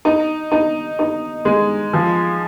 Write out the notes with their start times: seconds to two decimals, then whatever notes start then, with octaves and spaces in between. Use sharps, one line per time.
0.05 D#4
0.52 D#4
0.99 D#4
1.45 G#3
1.93 F3